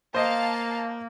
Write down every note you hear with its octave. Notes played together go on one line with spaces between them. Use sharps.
A#3 C5 D#5 F5 A5